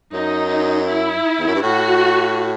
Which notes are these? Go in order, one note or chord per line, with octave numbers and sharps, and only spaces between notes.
F#2 D#4
E4
E2
F#2
G2
A2 F#4